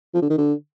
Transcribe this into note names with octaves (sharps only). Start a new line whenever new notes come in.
F3
D3
D#3
D3